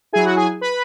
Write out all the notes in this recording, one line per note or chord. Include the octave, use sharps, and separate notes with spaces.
F#3 E4 G#4 G#5
F#4 F#5
G#4 G#5
B4 B5